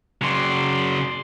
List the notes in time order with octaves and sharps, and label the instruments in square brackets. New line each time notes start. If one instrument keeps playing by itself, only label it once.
[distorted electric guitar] C#3 F#3 [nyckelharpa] D5 C6